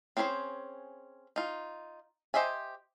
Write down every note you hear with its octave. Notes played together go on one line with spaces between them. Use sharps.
C4 C#4 G#4 B4 C5
D#4 F4
G4 C5 D#5 E5 G#5